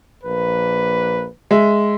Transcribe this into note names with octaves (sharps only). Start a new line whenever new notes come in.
A#1 A#3 B4
G#3 E5